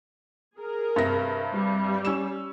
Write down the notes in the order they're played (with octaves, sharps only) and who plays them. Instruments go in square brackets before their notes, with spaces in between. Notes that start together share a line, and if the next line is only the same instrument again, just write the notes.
[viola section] G#4 A#4
[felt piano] G2 C3 A#6
[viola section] G3
[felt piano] C#4 E6 E7